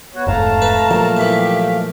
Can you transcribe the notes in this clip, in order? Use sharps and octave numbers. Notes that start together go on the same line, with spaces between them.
B3 F#4 C#5
E1 F2 G#2 A3 F5 A5 A#5
B4
A#2 F3 F#3
A#2 E3 G4 E5